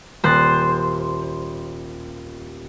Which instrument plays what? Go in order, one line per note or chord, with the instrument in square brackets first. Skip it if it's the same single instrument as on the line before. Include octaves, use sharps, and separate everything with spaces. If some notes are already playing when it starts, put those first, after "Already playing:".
[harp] D#1 F#6 A6 [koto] C5